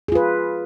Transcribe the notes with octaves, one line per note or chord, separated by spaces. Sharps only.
F4 G#4 B4